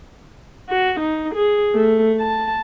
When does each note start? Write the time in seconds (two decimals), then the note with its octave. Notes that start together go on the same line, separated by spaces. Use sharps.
0.69 F#4
1.00 D#4
1.35 G#4
1.75 A3
2.21 A5